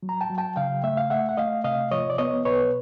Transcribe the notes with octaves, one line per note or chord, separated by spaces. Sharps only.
F#3
A#5
G5 A5
F#3
G5 A5
C#3 F5 G5
A3 E5
F5
A3 E5 F#5
F#5
A3 D#5 F5
C3 D#5 F5
F3 C#5 D#5
D5
B3 C#5 D#5
B2 B4 C#5